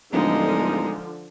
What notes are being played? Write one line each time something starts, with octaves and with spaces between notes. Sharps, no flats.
D1 D3 F3 G#3 D#4